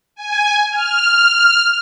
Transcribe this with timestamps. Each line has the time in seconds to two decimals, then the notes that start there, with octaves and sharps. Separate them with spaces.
0.15 G#5
0.70 F6